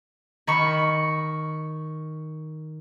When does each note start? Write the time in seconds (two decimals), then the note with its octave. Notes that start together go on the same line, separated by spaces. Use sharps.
0.47 D#3 B5 C#6